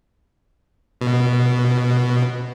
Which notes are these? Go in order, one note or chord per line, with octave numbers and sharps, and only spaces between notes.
B2